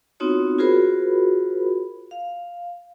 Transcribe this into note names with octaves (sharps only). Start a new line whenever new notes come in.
B3 C4 D#4 F4 F#4 C#5
F4 F#4 G#4 A#4 C5 B5
F5